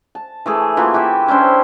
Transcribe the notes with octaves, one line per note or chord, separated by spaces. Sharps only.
A5
E3 A3 G#4
E3 A#3 F4 F#4
E4 G4 B4 E5
C#4 D4 E4 C5